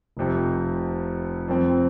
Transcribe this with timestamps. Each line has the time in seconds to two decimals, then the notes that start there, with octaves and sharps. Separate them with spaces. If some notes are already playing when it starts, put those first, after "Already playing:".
0.17 F1 F2 C3 F3
1.48 F2 F3 C4